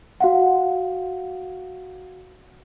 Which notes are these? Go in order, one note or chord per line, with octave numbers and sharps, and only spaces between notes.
F#4 F5 F#5